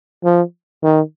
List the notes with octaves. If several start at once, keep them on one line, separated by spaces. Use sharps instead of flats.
F3
D#3